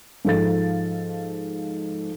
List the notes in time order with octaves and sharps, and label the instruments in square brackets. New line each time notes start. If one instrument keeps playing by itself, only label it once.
[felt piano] G#2 F3 A4 F5 A6